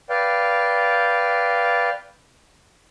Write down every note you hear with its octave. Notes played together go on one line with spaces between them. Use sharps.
B4 D5 F5 G5